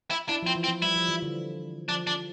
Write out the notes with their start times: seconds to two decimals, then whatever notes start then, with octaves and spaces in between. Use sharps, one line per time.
0.11 E4
0.29 D4 E4
0.43 F3 C4
0.55 E3
0.64 C4
0.69 F3
0.82 G3 E4
0.96 F3
1.09 E3
1.22 D3
1.89 F3 D4
2.07 D4